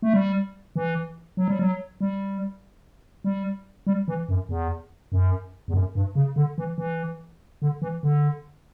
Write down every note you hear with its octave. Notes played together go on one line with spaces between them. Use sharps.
A3
G3
E3
F#3
G3
F#3
G3
G3
G3
E3
F#2
E2
F#2
E2
F#2
G2
C#3
D3
E3
E3
D3
E3
D3